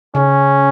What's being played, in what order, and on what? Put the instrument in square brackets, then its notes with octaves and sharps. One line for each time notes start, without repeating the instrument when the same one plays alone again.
[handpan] C#3 [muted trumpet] C#4